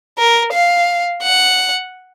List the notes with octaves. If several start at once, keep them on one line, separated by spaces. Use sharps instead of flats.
A#4
F5
F#5